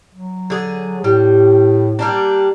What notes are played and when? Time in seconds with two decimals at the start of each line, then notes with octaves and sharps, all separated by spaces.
0.15 F#3
0.50 D3 G#4
1.04 A2 G3
1.99 G3 A#3 D4